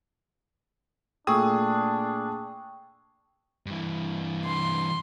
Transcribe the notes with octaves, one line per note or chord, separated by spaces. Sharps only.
A#2 A3 D4 G#4 G5 C#6 D#6 E6
G2 E3
C6